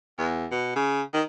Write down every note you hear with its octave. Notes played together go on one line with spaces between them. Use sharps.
E2
B2
C#3
D#3